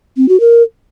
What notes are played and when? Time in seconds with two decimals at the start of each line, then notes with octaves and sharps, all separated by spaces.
0.17 C4
0.28 F#4
0.40 A#4